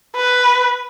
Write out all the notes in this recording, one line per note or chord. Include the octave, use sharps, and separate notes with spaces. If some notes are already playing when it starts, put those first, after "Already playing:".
B4